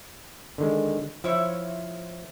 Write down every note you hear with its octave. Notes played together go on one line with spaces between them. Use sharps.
D3 D#3 G#3
F3 E4 C5 C#5 E5